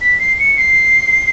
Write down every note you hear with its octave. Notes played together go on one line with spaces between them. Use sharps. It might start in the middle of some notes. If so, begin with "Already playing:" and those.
B6
C7
C#7
C7